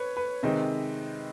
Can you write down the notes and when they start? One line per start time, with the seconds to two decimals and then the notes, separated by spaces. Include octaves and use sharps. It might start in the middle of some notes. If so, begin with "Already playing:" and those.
Already playing: B4 C#5
0.17 B4
0.43 C3 D#3 G#3 C4 D#4